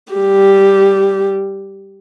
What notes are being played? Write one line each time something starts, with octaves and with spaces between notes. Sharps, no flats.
G3 G4